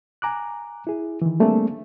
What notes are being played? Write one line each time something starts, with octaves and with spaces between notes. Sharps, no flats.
G#5 A#5 D6 F#6
E4 G#4
D#3 E3
G3 A3 A#3 C4 D4 G#4